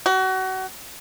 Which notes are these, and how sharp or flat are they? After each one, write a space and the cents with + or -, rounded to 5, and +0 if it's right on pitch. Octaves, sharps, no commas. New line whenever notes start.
F#4 +30